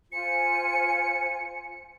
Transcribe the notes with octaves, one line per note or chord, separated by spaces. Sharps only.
F4 C5 G#5 C#7